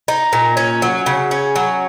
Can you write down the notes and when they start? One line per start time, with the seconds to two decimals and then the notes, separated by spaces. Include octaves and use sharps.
0.08 D#4
0.33 A#2
0.57 C#4
0.82 F#3
1.06 C#3
1.31 C#4
1.56 F#3